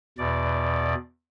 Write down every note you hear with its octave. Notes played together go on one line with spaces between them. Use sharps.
E2 B2 D5